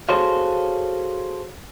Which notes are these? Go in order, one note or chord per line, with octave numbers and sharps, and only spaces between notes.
F#4 G#4 A4 C5 C#5 F5